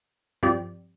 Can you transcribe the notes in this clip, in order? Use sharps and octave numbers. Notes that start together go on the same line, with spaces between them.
G2 F3 C4 G4 D5